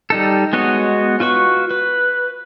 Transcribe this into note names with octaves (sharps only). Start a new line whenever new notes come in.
G3 D#4 A4
G#3 B3 F#4 C#5 D#5
F4 F#4 B4 C#6
B4